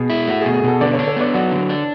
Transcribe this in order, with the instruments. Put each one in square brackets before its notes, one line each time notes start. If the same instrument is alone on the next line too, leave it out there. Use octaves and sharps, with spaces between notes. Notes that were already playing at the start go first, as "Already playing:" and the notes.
Already playing: [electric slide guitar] B2 [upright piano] G#4
[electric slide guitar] E4
[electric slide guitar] A3 [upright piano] F#4
[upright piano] G#4
[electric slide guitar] B2
[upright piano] G#4
[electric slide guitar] B2 [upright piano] F#4 A4
[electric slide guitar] D3 [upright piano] B4 D5
[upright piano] A4 C#5
[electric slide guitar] D4
[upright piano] A4 C#5
[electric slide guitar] B3 [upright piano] B4 D5
[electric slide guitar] F#3 [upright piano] D5 F#5
[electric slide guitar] D3
D4